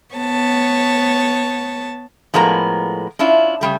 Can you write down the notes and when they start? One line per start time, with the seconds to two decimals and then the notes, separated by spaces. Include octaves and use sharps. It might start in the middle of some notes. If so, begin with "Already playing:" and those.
0.14 B3 C#5 A5
2.34 A2 F3 G#3 B3 A#4 A#5
3.19 C#4 D4 E4 F4
3.61 C#3 G3 A3